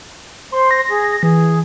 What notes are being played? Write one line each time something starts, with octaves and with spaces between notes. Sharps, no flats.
C5 C6
A#6
G#4
E3 G#4